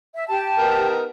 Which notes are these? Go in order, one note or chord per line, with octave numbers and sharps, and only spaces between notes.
E5
G4 A5
B3 D#4 A#4